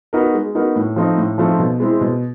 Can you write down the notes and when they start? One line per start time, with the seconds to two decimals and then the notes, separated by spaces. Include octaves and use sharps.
0.13 B3 D#4 F#4 A#4
0.34 G#3
0.55 B3 D#4 F#4 A#4
0.76 A2
0.96 F3 A3 C4 D#4
1.18 A2
1.38 F3 A3 C4 D#4
1.59 B2
1.80 G#3 C4 E4
2.01 B2